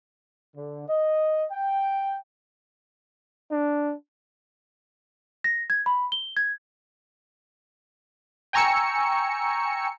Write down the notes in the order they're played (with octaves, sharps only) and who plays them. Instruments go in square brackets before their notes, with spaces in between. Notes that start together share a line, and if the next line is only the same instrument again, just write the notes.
[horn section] D3
D#5
G5
[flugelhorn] D4
[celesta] A#6
G#6
B5
G7
G#6
[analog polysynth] G5 G#5 A#5 C#6 E6 C#7